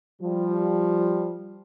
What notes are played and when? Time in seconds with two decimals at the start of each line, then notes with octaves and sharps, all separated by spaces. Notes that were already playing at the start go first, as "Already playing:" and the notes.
0.22 F3 G3